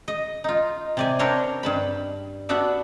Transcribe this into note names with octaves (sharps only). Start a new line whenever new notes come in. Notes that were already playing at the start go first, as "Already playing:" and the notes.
D#5
D#4 F4
C3 D5 G#5
C4 D4 A#4 C#5 C6
G2 A5 B5
B3 D4 F#4 D5 E5